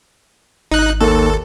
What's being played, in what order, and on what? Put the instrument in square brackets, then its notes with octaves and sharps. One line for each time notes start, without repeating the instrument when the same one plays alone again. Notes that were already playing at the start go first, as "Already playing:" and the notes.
[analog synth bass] G#1 [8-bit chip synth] D#4 F#6
[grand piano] D#2 [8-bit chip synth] A4